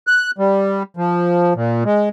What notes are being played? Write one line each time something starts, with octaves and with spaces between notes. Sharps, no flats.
F#6
G3
F3
A#2
G#3